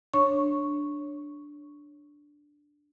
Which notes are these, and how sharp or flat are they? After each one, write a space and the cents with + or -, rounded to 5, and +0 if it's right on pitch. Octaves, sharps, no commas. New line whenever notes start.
D4 +0 C#5 +0 C#6 +0